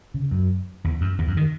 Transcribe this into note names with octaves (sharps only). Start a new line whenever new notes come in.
C#3
F#2
E2
F#2
E2
F#2
D#3